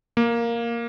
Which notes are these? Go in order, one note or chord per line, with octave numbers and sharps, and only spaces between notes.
A#3